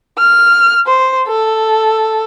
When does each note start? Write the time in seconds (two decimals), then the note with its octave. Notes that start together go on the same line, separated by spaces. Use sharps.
0.19 F6
0.87 C5
1.28 A4